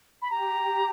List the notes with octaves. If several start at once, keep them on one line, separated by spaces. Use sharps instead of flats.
B5
G4 A#5